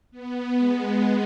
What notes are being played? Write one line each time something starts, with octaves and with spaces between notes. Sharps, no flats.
B3
G#3